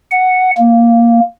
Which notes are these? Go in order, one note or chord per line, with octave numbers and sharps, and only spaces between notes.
F#5
A#3